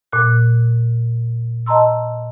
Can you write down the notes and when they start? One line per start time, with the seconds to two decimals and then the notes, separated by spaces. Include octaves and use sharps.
0.12 A#2 F#6
1.66 D#5 A5 A#5 C6 E6